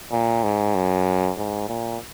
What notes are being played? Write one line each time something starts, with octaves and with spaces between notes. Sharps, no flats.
A#2
G#2
F#2
G#2
A#2